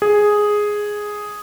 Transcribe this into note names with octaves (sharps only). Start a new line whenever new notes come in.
G#4